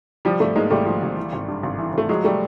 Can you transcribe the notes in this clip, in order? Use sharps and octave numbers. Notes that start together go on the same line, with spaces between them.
F3 G3
G#1 G3 A3
G#2 G#3 A#3
G#1 G3 A3
F3
G#1
E3
G#1
G2
G#1
E3
G#1 A3
F3 F#3 G#3
G3 A3